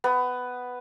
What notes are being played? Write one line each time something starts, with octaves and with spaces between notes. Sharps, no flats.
B3